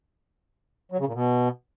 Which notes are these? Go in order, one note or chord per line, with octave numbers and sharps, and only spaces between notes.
F#3
C#3
A#2
B2